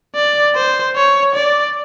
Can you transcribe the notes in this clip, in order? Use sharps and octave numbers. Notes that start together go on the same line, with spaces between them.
D5
C5
C#5
D5